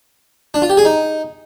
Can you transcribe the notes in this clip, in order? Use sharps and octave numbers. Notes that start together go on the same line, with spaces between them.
D4
F4
G4
G#4
D#4